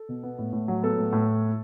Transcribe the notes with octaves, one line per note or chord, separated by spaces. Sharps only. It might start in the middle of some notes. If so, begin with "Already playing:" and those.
Already playing: A4
B2
B3
A2
A2
F#3
B3 A4
A2
A2